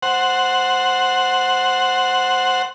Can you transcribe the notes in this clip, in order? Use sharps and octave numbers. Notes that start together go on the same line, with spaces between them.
C5 F#5